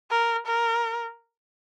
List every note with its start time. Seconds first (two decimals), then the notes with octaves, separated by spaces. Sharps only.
0.11 A#4
0.47 A#4